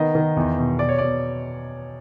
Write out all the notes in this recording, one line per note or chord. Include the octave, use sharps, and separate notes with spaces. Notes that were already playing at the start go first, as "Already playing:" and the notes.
Already playing: D#3 B3 D#5
D#3
E2
B2
B2 D5
C#5
B2 D5